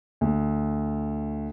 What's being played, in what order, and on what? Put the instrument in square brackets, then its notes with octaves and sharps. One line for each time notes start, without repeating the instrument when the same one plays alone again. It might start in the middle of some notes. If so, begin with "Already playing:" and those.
[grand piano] D2